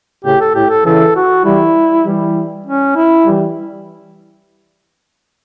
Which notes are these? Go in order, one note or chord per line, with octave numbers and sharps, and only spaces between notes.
A2 C#3 G4
A4
A2 G4
A4
C#3 E3 A4
F#4
E3 G3 E4
E3 G3
C#4
E4
E3 G3